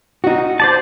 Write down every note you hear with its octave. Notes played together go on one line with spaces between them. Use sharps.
D#4 F#4
C5 D5 A5